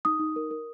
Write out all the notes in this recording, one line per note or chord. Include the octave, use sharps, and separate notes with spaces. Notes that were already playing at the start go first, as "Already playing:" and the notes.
D#4 D#6
D#4
A#4
A#4